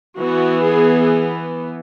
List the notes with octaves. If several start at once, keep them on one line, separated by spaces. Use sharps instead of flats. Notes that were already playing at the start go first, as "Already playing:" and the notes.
E3 B3 F#4
G#4